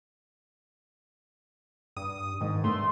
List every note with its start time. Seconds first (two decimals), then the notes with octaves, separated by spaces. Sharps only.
1.97 G2 D#6
2.41 G#2 D#3
2.64 G2 A3 C6